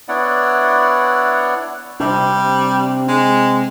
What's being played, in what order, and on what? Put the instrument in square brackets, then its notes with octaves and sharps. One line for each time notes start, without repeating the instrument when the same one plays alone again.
[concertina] B3 D4 E4 C#5 D5 F#5
[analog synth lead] C3 [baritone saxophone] G3 [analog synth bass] D4
[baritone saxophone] G#3